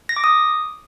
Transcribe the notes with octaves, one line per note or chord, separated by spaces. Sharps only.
A#6
D6
D#6